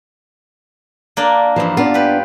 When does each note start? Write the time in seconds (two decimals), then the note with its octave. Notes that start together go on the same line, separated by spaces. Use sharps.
1.17 A#3 D4 D5
1.56 G2 E3 F3 D#4
1.77 B3 D4 F4 D5
1.94 G4 B4